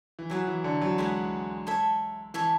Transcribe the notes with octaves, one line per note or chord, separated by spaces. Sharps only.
E3
F#3 E4 G#4 B4 F#5
E3
D3
F#3
G#3 E4 G#4 B4 F#5
A4 C#5 E5
E3 A4 C#5 E5